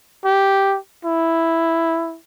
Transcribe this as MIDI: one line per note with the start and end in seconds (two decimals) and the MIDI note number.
0.25 0.77 67
1.05 2.17 64